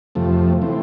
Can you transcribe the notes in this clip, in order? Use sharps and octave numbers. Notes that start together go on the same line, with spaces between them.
F2 C3 F3 A3
E3 A3 C4